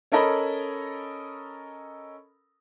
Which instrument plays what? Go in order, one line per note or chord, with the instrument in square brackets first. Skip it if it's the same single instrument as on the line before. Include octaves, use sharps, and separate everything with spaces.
[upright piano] C#4 A4 A#4 D#5 A#5 B5